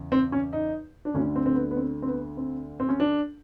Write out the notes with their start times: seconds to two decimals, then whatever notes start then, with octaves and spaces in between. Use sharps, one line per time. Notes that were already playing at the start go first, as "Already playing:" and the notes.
Already playing: E2 C#3
0.12 C4
0.32 C#4
0.53 D#4
1.05 D4
1.14 D2 C#4
1.18 D3
1.36 C4
1.46 C4
1.55 B3
1.71 B3
1.76 C4
2.02 C4
2.07 B3
2.37 C4
2.80 C4
2.89 C#4
3.00 D4